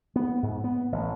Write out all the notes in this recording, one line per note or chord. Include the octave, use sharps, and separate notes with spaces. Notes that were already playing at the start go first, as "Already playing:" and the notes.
B3
G#2
B3
A1